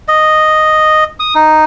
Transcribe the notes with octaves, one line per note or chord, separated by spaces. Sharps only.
D#5
D#6
D#4